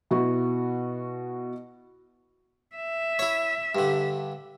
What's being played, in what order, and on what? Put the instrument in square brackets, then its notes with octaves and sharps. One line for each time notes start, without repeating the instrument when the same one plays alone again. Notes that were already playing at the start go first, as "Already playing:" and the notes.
[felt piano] B2 E4 F#4
[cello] E5
[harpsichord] E4 C#5
G2 D3